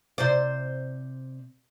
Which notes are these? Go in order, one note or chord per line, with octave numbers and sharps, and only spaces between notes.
C3 C5 D5